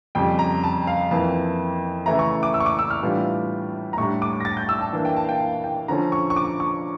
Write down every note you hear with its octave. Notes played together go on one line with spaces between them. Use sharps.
F2 C#3 G3 G5
A#5
A5
F5
F2 E3 A#3 A5
C#3 E3 A3 E4 A#5
C#6
D6
E6
C#6
D6
E6
F6
A2 E3 G3 D4 F4
A#5
A2 G3 D4 C#6
D6
A#6
A6
G6
E6
A5
E3 A#3 D4
G5
A5
F5
G5
F5
G5
D3 F3 C#4 A#5
C#6
C#6
D6
C#6